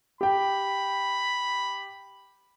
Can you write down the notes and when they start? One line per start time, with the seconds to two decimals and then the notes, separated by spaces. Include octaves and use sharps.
0.21 G4 G5 B5